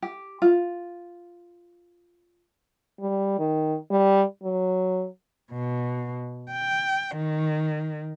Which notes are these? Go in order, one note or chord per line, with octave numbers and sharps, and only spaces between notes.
G4
F4
G3
D#3
G3
F#3
B2
G5
D#3